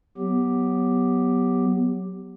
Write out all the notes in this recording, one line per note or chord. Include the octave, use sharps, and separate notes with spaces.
F#3 B3 G4